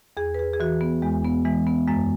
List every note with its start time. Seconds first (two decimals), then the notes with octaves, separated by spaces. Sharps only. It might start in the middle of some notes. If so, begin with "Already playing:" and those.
0.17 E2 G#4
0.34 B4
0.39 G#4
0.53 G#4
0.60 E3 F#4
0.81 B3
1.02 E2 G#3
1.25 B3
1.45 E3 G#3
1.67 B3
1.88 F#2 G#3